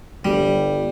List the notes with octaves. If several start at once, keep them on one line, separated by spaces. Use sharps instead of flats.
G1 G3